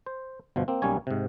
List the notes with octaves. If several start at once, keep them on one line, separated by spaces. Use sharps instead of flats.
C5
G1 B2 F3
A#3 C4
B1 G3 A#3 C#4 C#5 G#5
G#2 C3